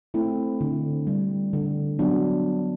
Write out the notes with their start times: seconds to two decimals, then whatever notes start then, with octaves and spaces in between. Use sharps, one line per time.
0.14 A3 C4 E4
0.61 D3
1.07 G3
1.53 D3
1.99 F#3 B3 D4